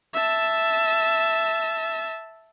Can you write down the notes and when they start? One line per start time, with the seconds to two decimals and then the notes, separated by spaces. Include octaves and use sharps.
0.14 E5 A5